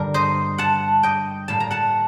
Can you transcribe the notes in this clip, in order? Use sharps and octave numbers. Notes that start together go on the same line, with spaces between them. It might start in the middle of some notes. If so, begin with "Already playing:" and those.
Already playing: G2 D3 G3 A#4
C5 D#5
F#5 A5
D#5 G5
A2 G3 A#3 A5
A#5
F#5 A5